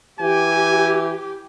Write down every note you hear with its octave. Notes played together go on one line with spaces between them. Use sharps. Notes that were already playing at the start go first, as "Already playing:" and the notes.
E3 G4 G#5